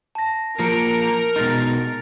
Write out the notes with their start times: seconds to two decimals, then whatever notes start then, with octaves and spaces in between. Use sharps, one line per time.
0.15 A5 A#6
0.59 F3 A#3 A#4 A#6 C#7 D7
1.36 B2 G#3 D#4 F6 A6